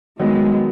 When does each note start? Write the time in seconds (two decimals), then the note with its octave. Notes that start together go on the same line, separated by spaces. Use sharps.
0.19 D#3 F#3 G#3 B3